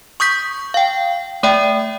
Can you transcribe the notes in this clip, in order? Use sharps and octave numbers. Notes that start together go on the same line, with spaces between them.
C#6 D#6 G6 B6
F5 G5
A3 D5 E5 G5